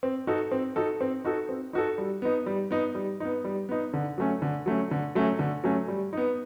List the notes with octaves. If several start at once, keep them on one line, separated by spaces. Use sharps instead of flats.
C4
D#4 F#4 A4
C4
D#4 F#4 A4
C4
D#4 F#4 A4
C4
D#4 F#4 A4
G3
B3 D#4
G3
B3 D#4
G3
B3 D#4
G3
B3 D#4
D3
F#3 A3 C#4
D3
F#3 A3 C#4
D3
F#3 A3 C#4
D3
F#3 A3 C#4
G3
B3 D#4